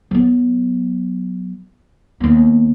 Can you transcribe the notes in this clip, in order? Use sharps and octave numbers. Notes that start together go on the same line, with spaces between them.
F#3 B3
D#2 B3